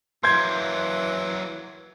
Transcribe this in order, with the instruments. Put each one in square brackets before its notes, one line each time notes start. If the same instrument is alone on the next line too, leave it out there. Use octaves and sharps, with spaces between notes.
[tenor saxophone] E3 [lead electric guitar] F#3 A#3 [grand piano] C6 G6 G#6